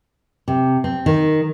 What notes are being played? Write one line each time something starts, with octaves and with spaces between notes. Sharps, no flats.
C3
C4
D#3